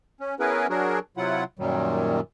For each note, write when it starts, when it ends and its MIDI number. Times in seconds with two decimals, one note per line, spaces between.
0.20 0.35 61
0.40 0.67 59
0.40 0.67 61
0.40 0.67 64
0.40 0.67 68
0.40 0.67 70
0.40 0.67 71
0.70 0.99 54
0.70 0.99 62
0.70 0.99 66
0.70 0.99 68
0.70 0.99 70
1.17 1.44 48
1.17 1.44 54
1.17 1.44 64
1.17 1.44 65
1.17 1.44 78
1.59 2.20 42
1.59 2.20 46
1.59 2.20 51
1.59 2.20 54
1.59 2.20 55